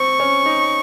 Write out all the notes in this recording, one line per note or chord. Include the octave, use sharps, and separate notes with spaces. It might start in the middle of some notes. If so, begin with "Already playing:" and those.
Already playing: C4 C#6
C#4
D#4